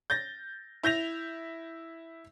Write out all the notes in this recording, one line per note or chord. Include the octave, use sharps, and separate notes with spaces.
G6 A6 A#6
E4 G6 A#6 F7